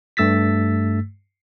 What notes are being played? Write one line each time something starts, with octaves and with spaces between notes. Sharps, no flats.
G2 A3 E6 A6 B6